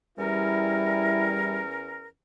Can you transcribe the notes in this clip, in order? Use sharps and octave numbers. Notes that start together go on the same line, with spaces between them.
E2 G3 C#4 E4 A#4